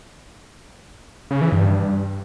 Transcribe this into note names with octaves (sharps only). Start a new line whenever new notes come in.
C#3
E3
G2